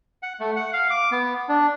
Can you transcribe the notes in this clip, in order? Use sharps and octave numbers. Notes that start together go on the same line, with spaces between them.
F#5
A3
F#5
F5
D6
B3
D4